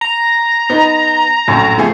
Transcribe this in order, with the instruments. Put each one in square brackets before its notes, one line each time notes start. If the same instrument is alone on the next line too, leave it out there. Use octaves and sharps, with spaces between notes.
[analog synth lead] A#5
[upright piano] B3 D#4
A#1 F#2 A2
F3 A3 G#4